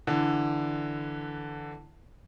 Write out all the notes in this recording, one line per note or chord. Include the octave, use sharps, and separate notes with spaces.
D3 E3